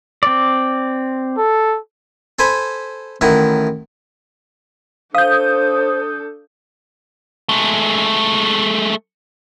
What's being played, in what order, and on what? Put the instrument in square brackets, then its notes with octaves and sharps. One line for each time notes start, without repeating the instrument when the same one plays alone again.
[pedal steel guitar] C4 D5
[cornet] A4
[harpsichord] A4 C5 G#5 B5
A1 D#3 E4 F#5
[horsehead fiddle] D4 A4 [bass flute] C5 [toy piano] F5 [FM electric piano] D#6 G6
[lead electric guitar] G#3 A3